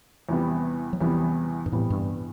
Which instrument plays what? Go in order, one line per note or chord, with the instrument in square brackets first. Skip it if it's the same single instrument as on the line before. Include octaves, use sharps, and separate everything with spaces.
[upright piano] E2 C3 G3 B3
[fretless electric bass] F#3
[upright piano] E2 C3 G3 B3 [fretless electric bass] E3
[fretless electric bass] G2
[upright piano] E2 C3 G3 B3 [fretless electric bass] A2
[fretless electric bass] G2